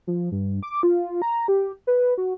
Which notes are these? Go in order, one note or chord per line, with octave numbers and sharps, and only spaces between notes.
F3
G2
D6
F4
A#5
G4
B4
F#4